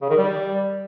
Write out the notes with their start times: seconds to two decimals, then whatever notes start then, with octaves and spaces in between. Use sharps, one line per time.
0.02 C#3
0.10 D#3
0.17 G3